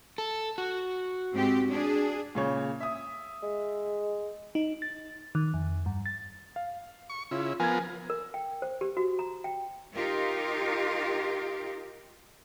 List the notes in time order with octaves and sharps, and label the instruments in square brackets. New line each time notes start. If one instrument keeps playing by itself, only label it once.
[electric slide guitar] A4
F#4
[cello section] G#2 C4 G4
D4 G#4
[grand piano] A#2 C#3 C#5
E5 D#6
[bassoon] G#3
[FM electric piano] D#4
A6
D#3
F2
G2
A6
[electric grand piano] F5
[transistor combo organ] C#6
[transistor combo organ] C#3 E4 [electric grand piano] F4
[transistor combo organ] F3 B3 A#4 [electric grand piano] G#5 G#6
[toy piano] A#4
G5
C5
G4
F#4
A#5
G5
[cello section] D#4 F4 G4 A#4